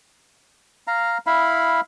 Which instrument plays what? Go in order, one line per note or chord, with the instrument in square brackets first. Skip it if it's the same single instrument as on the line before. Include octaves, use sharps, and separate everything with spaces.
[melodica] F5 A#5
E4 F5 B5